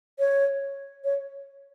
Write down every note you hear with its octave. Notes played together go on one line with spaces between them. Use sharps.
C#5
C#5